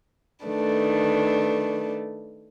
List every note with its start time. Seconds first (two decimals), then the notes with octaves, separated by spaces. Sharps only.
0.46 D#3 A3 D4 B4